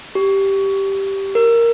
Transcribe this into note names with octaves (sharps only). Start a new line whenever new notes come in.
G4
A#4